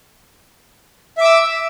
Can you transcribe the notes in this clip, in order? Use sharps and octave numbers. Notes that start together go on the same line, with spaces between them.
E5 D6 E6